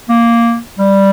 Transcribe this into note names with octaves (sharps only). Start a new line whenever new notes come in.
A#3
G3